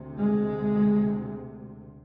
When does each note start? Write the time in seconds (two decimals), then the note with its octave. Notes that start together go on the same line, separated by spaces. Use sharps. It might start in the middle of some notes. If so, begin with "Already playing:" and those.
Already playing: D2 C3
0.17 G#3